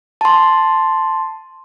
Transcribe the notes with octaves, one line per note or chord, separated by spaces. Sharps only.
A5 C6